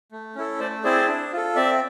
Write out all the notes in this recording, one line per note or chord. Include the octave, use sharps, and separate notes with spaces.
A3
C#4 E4 A4
A3 C5 D5
C4 E4 G#4 C5 D5
D4
F4 A4
C4 D5 E5